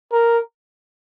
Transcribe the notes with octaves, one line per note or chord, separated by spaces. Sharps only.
A#4